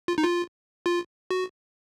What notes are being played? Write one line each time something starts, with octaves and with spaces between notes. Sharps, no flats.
F4
D#4
F4
F4
F#4